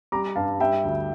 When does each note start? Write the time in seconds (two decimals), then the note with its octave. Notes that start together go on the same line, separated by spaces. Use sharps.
0.12 G3 A#5 D6
0.36 G2 F5 A5
0.60 G3 E5 G5
0.84 D2